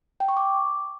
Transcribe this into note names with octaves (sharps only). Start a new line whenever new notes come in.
G5
C#6
D6